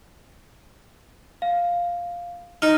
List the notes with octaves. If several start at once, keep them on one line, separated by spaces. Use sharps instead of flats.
F5
D#4 F6